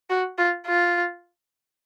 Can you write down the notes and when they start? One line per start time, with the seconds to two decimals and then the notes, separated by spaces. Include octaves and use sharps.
0.10 F#4
0.38 F4
0.66 F4